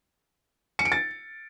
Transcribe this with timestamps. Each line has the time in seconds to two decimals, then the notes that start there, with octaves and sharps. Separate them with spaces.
0.79 C#7
0.85 D7
0.92 A6